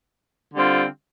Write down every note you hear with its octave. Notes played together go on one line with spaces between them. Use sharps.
D3 G3 C4 F4